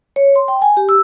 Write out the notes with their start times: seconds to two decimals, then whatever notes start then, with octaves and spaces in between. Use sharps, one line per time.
0.16 C#5
0.36 C6
0.48 G5
0.62 G#5
0.77 G4
0.89 E6